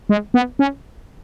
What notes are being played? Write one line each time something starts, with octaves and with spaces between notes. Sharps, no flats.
G#3
B3
C#4